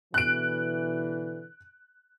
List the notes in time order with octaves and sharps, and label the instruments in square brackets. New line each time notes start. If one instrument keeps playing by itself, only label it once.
[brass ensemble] B2 D3 E3 [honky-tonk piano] F#6 D7